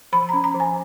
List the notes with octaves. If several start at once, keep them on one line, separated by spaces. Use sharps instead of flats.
F3 B5
C#4 A#5
A#5
F3
G#5